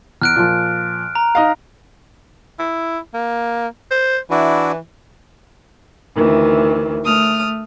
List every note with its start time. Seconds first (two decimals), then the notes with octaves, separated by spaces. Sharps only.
0.21 E2 F6 F#6 D7
0.36 A#2 F3
1.15 A#5
1.35 D#4 D#5 F5
2.59 E4
3.14 A#3
3.91 C5
4.30 E3 D4 E4 F#4
6.14 D2 D#3 E3
7.04 A3 D#6 F6